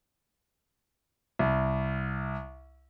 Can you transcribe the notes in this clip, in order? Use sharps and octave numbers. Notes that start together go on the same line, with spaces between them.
C2